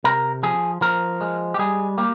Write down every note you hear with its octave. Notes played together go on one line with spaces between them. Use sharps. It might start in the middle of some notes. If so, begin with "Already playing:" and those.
C3 A#4
F3 G#4
F3 A#4
G#3
G4
G3 G#4
A#3 G4